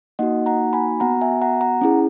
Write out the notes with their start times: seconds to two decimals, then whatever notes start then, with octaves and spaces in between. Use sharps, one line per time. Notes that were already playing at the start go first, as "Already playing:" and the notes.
0.19 A#3 D#4 F#4 D#5 F#5
0.46 F#5 A#5
0.73 G#5 B5
1.00 B3 F#4 F#5 A#5
1.21 E5 G#5
1.42 F#5 A#5
1.61 F#5 A#5
1.81 C#4 E4 G#4